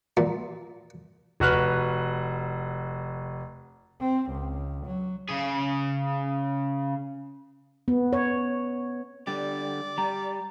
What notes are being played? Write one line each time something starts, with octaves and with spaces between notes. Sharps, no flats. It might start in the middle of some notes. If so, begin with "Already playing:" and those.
A#2
F1 F#4 B4 F6 F#6
C4
C#2
F#3
C#3 G#4
B3
C#5
D3 G3 D5
G3 A#5